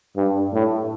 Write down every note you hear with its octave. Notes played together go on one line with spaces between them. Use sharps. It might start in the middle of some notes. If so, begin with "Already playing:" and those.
G2
A2